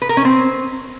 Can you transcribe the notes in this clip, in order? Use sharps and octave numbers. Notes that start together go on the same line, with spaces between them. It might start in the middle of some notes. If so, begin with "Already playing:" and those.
B4
A#4
C#4
C4